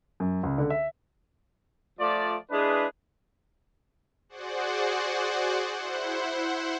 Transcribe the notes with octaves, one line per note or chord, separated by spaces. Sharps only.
F#2
C#2
D3
E5
F3 A3 F4 D5
G#3 D4 E4 G#4 B4
F#4 G#4 C5 D5 F#5
E4 C5 F#5